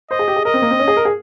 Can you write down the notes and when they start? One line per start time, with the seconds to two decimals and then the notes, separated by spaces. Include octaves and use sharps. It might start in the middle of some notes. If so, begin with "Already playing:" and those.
0.10 C5 D#5
0.19 G#4
0.28 G4
0.36 G#4
0.44 A#4 D#5
0.54 C4
0.62 A#3
0.71 C4
0.79 C#4
0.88 G#4
0.97 A#4
1.05 G#4